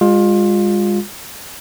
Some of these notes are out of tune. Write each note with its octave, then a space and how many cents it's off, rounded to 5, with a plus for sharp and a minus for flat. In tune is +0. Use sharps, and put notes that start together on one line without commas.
G#3 -35 F4 +20